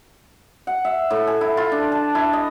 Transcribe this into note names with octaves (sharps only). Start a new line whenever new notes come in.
F#5
E5
A2
G#5
E4
F4
D4
A5
E4
D#5